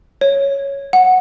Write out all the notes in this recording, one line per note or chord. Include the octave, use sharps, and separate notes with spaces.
C#5
F#5